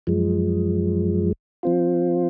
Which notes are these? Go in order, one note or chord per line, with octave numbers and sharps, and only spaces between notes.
F#2 F3 G#3
F3 C4 F4